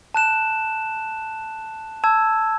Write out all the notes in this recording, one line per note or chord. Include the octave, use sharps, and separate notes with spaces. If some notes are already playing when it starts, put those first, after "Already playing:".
A5 F#6 E7
A5 E6 G#6